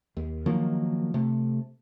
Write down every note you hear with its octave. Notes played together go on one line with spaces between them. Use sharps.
D#2
D#3 F3 F#3 A#3
C3 A3